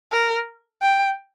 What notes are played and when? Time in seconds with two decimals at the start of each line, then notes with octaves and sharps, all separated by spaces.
0.12 A#4
0.82 G5